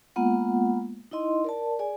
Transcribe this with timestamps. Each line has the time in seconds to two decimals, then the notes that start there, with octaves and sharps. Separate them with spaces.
0.16 G#3 A#3 B3 F4 F#5
1.11 D#4 E4 D#5 C6
1.44 A#4 D5 A5
1.79 G#4 D5 G#5